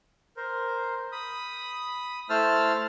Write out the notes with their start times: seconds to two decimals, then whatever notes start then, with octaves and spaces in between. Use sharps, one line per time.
0.37 A#4 C5
1.12 B5 D#6
2.30 A3 E4 C5 A5 E6 F6